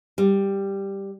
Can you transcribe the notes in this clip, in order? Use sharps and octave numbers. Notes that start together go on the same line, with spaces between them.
G3